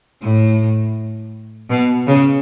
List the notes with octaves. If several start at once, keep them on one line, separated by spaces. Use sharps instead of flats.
A2
B2
C#3